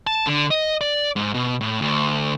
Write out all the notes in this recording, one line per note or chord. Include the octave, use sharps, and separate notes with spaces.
A5
D3
D#5
D5
G#2
B2
A2
D2